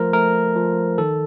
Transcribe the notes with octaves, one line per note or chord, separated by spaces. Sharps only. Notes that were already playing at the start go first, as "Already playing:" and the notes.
Already playing: F3 A3 A#4 C5
A3 A#4
F3
D#3 A4